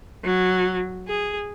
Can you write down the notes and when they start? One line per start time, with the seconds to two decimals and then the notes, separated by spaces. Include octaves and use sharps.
0.24 F#3
1.08 G#4